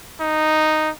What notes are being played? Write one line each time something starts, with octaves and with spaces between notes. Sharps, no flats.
D#4